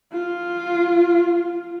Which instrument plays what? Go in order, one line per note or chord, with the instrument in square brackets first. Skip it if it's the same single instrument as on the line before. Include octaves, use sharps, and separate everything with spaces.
[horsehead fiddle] F4